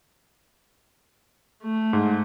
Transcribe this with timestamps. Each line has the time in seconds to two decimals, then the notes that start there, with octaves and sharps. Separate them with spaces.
1.63 A3
1.93 G#2